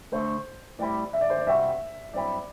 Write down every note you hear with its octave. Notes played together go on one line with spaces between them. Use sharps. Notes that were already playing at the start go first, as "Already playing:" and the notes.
D2 D3 A3 C5
A2 G3 C4 E4 D5
E5
D5
C5
D5
C2 C3 G3 C4 F#4 E5
G2 F#3 C4 E4 D5